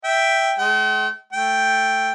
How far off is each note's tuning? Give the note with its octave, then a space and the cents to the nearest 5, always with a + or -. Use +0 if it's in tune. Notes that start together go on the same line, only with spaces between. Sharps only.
E5 +0 G5 +0
G#3 +40 G5 -45
A3 +0 G5 +0